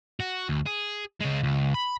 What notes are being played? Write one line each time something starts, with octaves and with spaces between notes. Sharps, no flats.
F#4
D2
G#4
C#3 G#3
C#2
B5